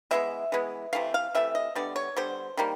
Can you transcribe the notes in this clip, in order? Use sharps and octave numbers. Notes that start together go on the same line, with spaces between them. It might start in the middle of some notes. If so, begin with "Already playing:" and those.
E3 G#3 B3 E5
E3 G#3 B3
C3 E3 A3 F5
F5
C3 E3 A3 E5
D#5
D3 G3 B3 D5
C#5
D3 G3 B3 C5
D#3 G3 A#3